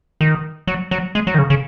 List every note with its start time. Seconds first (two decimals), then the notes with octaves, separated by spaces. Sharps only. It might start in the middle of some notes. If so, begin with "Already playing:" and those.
0.21 D#3
0.67 F#3
0.91 F#3
1.15 G#3
1.27 F#3
1.34 D#3
1.38 C#3
1.50 C#3